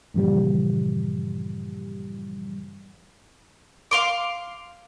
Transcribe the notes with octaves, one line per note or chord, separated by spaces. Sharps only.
G2 A#2 C#3 E3 F3 G3
F5 C6 D6